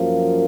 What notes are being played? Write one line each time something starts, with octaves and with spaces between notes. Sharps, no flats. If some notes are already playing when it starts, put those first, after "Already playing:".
Already playing: F#2 F3 A#3